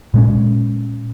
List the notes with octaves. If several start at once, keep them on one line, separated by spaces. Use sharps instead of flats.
A#2 G#3 C#4